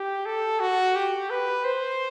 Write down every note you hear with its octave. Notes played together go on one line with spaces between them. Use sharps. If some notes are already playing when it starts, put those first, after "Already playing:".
Already playing: G4
A4
F#4
G4
B4
C5